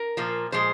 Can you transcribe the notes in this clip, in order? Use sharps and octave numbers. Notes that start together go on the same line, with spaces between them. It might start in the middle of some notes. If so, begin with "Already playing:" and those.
Already playing: A#4
A#2 F3 A#3
A#2 F3 G#3 C5